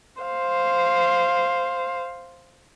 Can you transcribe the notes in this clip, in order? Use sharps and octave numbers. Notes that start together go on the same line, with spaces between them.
C5 F5